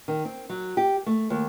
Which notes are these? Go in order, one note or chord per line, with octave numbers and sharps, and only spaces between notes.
D#3
C4
F#3
G4
A3
D#2